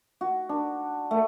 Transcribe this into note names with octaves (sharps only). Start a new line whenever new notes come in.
F#4
D4
A3